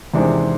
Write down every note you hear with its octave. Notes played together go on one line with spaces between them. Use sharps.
E2 C3 D#3 G#3 C4 D4